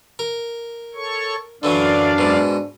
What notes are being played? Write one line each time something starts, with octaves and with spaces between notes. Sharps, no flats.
A#4
A4 C#5 C#6
F#2 D3 E3 F#3 D4 D5 F5
G#2 B2